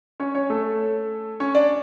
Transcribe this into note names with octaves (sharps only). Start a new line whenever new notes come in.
C#4 C#5
C#4 C#5
A3 A4
C#4 C#5
D4 D5